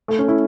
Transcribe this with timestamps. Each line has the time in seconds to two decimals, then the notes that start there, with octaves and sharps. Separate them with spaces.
0.08 A3
0.19 C#4
0.28 E4